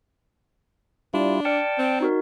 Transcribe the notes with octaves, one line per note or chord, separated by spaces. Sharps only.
G3 D4 E4 F4
D5 G5 A5 F6 C#7
C4
D#4 F#4 A#4